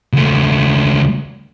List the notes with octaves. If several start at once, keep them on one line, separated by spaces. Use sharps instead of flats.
C#2 A3